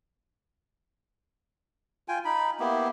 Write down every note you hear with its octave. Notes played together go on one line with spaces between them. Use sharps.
F4 G5 G#5
D#4 B5
A#3 B3 E4 G4